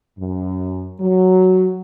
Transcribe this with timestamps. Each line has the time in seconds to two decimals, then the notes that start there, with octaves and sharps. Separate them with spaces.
0.18 F#2
1.00 F#3